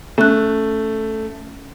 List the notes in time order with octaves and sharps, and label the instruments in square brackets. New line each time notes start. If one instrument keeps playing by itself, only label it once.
[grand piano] A3 [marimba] C#4 F#6